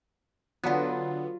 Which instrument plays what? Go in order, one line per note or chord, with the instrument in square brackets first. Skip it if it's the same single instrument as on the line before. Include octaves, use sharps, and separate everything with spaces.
[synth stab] D3 B3 [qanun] F#3 F4